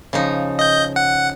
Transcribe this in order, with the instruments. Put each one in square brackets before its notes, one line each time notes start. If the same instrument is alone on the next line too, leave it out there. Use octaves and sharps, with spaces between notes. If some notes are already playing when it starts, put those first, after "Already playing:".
[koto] C#3 F3 D#4
[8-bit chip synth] D#5 G6
F#5